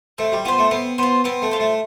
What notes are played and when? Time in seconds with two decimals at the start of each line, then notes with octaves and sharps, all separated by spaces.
0.18 A3 C4
0.32 G3
0.45 B3 F4 C5
0.58 A3
0.71 B3 C4
0.98 B3 F4 C5
1.24 B3 C4
1.42 A3
1.51 F4 C5
1.60 A3